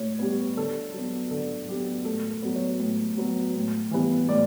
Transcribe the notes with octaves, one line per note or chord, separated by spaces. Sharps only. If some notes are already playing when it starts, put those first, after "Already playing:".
Already playing: A2 C#5
G3 B3
D3 A4
F#3 B3
D3 A4
F#3 B3 G4
A2 A4
A4
F#3 B3
C#5
A2
F#3 B3
A2
E3 G3 B3
A2 D5